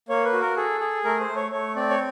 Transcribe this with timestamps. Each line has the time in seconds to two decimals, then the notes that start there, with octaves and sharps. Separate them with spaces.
0.09 A#3 C#5
0.24 B4
0.32 F#4
0.41 A#4
0.56 G#4 A4
0.80 G#4
1.04 A3 A#4
1.20 C5
1.28 A3
1.36 C#5
1.52 A3 C#5
1.76 C4 D5
1.90 C#5